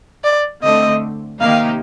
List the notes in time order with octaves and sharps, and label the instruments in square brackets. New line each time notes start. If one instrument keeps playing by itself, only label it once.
[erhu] D5
[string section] D3 A3 C4 [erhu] D#5
[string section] C3 D#3 A#3 D#4 G4 [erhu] F5